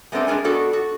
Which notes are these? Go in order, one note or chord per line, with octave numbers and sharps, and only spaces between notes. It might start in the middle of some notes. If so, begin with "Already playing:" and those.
G#3 A3 B3 C4 D4 A4
G#3 D4 G#4 A#4 G#5
B3 D4 F#4 A4
F#4